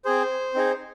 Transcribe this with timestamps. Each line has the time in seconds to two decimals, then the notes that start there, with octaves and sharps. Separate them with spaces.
0.05 C4 G#4 C5
0.54 C4 D#4 G#4